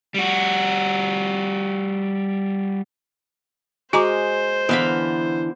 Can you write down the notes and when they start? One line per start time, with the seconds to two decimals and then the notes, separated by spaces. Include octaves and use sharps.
0.14 G3 F#4
3.93 G#3 F#4 C5 A#5 D6
4.69 D3 E3 B3 F5 B5